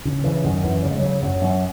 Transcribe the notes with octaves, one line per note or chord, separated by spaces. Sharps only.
C#3
C#3 E3
F#2 D#3
F#2 E3
C#3 F#3
G#3
C#3 F#3
F#2 F#3
F#2